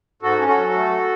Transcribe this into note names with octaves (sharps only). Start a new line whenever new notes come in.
G#2 F#4 A4
C#4
F#4 A4
F#3
A3